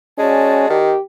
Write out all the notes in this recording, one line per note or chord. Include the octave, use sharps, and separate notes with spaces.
G#3 C#4 F#4 D5 A5
D#3 G4